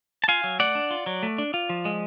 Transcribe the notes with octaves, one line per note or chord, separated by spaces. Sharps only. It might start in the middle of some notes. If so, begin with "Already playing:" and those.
A5
F4 F5 G#5
F#3
A3 D5 F#5
D4
F4
F#3
A3
D4
F4
F3
G#3